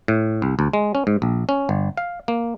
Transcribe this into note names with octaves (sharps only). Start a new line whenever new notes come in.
A2
C2
D2
G#3
C#4
G#2
A#1
C#4
G1
F5
A#3